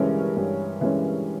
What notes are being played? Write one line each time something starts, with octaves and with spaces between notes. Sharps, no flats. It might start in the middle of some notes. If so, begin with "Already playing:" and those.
Already playing: G2 E3 G#3 C#4 A#4
G2
E3 G#3 C#4